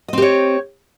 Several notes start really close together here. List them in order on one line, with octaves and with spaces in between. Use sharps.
D#5 C4 G4 C#5